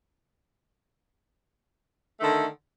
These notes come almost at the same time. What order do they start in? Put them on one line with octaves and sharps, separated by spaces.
A3 D#3 D3